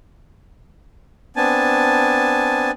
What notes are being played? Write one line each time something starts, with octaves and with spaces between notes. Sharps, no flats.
B3 C4 D4 G#5 A5